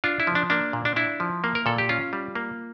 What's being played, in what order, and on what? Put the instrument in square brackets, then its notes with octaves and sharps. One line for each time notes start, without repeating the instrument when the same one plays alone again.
[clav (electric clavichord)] D4 F4
E4
F3
D4
A#3 D4
A#2
D4
D4 E4
F3
A#3
A#4
A#2 A4
G4
C#4 F4
G3
A#3